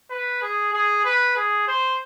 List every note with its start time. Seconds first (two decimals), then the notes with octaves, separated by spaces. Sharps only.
0.10 B4
0.42 G#4
0.73 G#4
1.05 B4
1.36 G#4
1.68 C5